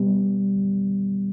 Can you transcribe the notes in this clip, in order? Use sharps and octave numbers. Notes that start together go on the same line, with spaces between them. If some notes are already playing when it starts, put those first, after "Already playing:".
Already playing: B2 G3 B3